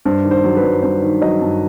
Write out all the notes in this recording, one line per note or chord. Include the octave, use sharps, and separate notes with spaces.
G2 C5
D#3
C5
F#3
B4
G2
G2 C5
D#3
F#3 D#5
G2